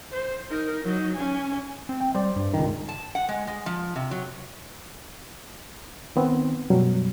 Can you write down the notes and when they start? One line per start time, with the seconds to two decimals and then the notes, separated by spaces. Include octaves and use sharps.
0.12 C5
0.50 D#4 A#4
0.84 F#3 D#4
1.16 C#4 G#5
1.89 C4
2.00 G5
2.15 G3 C5 D5
2.36 G2
2.54 C#2 D#3
2.89 A5
3.15 F#5
3.29 G#3
3.47 G#3
3.66 F3
3.96 C3
4.11 F#3
6.16 D#3 B3 C4
6.70 F#2 B2 F#3 G3